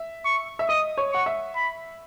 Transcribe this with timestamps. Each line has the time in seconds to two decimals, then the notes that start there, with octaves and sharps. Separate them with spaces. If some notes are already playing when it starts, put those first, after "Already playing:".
Already playing: E5
0.25 C#6
0.59 E5
0.69 D#5 D#6
0.98 C#5
1.12 F#5 C#6
1.26 E5
1.55 B5